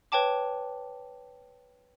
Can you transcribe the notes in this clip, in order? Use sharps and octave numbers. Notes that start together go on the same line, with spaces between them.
B4 C#5 G5 A5 D6